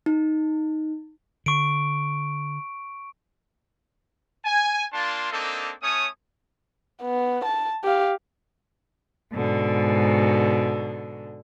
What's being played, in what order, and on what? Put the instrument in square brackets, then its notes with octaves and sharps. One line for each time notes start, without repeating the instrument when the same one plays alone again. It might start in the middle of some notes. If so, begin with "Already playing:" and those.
[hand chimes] D#4
[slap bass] D3 [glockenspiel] C#6 D7
[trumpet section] G#5
A#3 D4 F4 A5 C6
A#3 C4 D4 D#4 A4
A3 C#4 C#5 D#6
[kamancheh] B3
A5
G4 F5
[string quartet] G#2 B2 D3